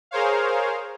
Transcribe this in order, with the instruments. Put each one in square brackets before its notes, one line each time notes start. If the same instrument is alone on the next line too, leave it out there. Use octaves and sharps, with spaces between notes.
[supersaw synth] G#4 A#4 C5 C#5 F5